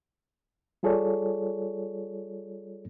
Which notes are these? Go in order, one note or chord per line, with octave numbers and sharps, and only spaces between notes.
G3 F4 G#4 A4 C#5 D5